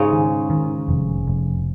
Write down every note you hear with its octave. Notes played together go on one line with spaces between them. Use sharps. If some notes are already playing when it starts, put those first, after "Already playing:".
Already playing: G#2 C#3 G#3 C#4
D#3
D#3
F1
F1